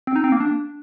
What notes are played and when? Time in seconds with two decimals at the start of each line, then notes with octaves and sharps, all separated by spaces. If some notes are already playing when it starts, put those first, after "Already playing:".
0.07 C4
0.16 D#4
0.24 C4
0.32 A#3
0.40 D4